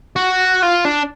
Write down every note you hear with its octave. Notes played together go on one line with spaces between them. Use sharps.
F#4
F4
D4